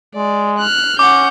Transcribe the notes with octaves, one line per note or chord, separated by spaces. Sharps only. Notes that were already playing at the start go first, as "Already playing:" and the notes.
G#3 D5
F6 F#6
C#4 F#5 D6 G6